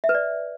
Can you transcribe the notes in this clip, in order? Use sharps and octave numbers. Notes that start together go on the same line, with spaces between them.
E5
B4
D5